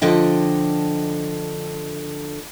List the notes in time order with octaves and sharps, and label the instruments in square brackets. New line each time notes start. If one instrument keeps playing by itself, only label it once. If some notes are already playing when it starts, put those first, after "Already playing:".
[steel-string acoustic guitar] D3 F3 D#5 G5